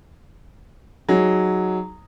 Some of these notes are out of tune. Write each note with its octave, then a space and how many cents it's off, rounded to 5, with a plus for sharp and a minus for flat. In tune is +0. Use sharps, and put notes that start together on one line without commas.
F#3 +0 D#4 +5 G#4 +0